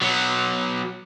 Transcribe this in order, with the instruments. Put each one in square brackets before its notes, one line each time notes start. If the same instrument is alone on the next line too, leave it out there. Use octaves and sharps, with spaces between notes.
[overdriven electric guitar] F#3 B3